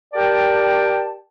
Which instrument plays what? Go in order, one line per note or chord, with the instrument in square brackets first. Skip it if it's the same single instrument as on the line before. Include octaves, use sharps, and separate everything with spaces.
[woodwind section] G4 A#4 D5 G5 A5